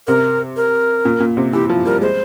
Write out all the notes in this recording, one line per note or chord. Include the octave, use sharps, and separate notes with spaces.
C3 A#4
A#4
A#2
A#2
C3
E3 G4
F3
G3 A#4
G#3 C5